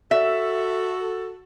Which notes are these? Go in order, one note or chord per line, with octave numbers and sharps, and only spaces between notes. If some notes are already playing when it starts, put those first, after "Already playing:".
F#4 A4 E5